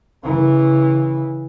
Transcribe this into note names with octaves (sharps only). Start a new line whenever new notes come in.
C#3 E3